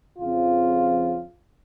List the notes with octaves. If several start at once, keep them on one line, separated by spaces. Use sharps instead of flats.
F2 C#3 F3 F4